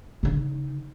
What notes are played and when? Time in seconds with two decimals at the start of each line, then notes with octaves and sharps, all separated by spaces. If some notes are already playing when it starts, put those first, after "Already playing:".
0.23 C#3 D#4